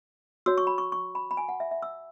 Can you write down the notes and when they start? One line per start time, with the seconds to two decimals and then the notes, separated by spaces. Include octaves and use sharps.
0.46 F#4 C#5 E6
0.58 C#6
0.67 B5
0.78 C#6
0.92 C#6
1.15 B5
1.31 B5
1.37 G#5
1.49 F#5
1.60 E5
1.71 E5
1.82 E6